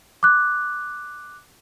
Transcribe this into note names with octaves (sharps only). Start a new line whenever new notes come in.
D6 F#6